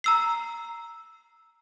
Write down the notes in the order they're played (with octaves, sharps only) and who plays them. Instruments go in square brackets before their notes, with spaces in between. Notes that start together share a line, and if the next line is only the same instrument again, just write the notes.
[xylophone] A#5 E6 C7